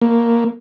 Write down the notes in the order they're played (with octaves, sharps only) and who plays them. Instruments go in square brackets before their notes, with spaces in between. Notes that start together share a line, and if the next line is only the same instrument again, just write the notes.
[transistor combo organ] A#3